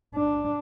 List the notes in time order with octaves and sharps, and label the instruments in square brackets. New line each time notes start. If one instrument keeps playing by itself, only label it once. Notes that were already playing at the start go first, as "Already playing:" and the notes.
[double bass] D4